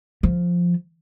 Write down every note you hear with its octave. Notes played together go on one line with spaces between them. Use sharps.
F3